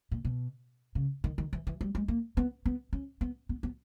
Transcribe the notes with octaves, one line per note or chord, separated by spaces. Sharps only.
A#2
B2
C#3
D#3
D#3
E3
E3
G3
G#3
A#3
B3
B3
C#4
B3
B3
B3